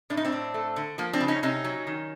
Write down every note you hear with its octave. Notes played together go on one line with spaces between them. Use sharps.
A2 D4
D#4
C4 D4
A2
A3
D3
F3 A#3
C4 D4
C#3
C#4 D#4
C3 C#4 D#4
F#3
D#3